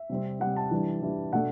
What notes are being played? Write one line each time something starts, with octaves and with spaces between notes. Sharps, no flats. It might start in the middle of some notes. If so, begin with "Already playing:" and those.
Already playing: E5
C3 G3 C4
C3 G3 C4 F#5
A5
E3 G3 D4
E3 G3 D4
B2 A3 D4 F#5